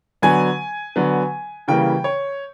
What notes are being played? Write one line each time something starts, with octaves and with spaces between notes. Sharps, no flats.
D3 F#3 B3 G#5
D3 F#3 B3
C#3 E3 G3 A#3 G5
C#5